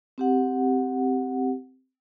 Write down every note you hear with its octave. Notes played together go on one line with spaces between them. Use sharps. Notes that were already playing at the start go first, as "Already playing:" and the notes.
C4 G4 F#5